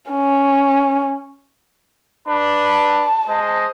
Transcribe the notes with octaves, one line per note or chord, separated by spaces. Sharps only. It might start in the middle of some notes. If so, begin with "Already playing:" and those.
C#4
D4 B4 B5
A5
G#3 C5 D#5